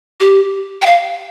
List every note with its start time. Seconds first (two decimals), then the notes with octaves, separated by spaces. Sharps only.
0.20 G4
0.82 G5
0.86 F5